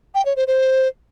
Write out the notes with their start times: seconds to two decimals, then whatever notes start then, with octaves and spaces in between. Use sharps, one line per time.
0.14 G5
0.25 C#5
0.36 C5
0.47 C5